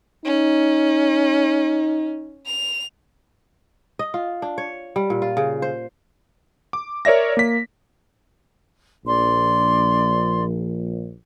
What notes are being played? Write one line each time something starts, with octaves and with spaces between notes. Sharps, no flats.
C#4 D#4
F7
D#5
F4
D4
C#5
G3
A#2
F4
C#3
C5
D6
A#4 C#5 D5 E5 A#6
A#3 B6
A#1 D5 C6